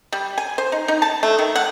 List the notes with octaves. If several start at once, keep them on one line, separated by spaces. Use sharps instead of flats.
G3
G#5
C5
D#4
D#4
A5
A3
D#3
F#5